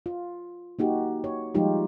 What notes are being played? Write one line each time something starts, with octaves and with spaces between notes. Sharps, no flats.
F4
A#3 D#4 F#4 G4
C#5
F3 G3 G#3 D#4 F4 G4